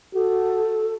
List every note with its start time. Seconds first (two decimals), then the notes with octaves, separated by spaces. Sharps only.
0.15 F#4 A4